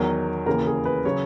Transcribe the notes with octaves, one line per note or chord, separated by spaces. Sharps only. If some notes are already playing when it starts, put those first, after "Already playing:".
Already playing: E2 D#3 F#3 A#4
D#2 C#3 E3 A#4
G#4
B4
C#3 F#3 C#5